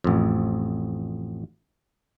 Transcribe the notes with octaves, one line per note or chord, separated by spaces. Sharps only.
A1 F2